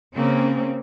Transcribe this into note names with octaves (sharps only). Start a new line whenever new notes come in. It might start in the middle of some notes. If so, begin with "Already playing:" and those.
C#3 A#3 C4 C#4